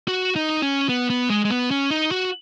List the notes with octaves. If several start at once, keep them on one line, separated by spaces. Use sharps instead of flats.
F#4
D#4
C#4
B3
B3
G#3
G#3
B3
C#4
D#4
F#4